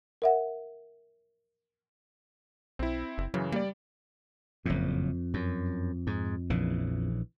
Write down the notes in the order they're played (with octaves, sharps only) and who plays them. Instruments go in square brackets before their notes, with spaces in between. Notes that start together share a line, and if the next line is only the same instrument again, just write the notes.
[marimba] A#4 E5 F#5
[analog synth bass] B1 [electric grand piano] C4 E4
[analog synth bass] F#1
[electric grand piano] F#2 C#3 E3 [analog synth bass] F#3
[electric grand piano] G3 D5 [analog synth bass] A#3
[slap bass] F#1 A2 [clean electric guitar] F2
[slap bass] F#2
G#2
A#1 C#3 E3